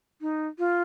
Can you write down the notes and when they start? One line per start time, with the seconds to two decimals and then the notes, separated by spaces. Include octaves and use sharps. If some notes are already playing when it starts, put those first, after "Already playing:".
0.21 D#4
0.59 F4